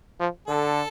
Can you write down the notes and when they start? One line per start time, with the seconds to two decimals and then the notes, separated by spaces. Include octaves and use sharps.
0.20 F3
0.47 D3 A4